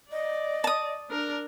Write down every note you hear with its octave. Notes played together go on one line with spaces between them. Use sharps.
D5 D#5
A5 D#6
D4 A#4